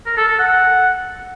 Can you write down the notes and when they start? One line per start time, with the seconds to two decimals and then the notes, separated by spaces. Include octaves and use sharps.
0.07 A#4
0.18 A4
0.28 A4
0.39 F#5